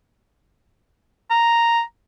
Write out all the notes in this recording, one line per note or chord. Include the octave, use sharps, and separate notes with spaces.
A#5